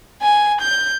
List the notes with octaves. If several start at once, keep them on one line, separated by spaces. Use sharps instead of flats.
G#5
G6